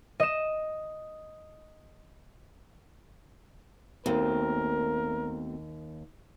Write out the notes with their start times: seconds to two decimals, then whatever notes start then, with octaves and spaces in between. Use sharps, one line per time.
0.20 D#5 E7
4.06 D#2 B2 A3 C4 A#4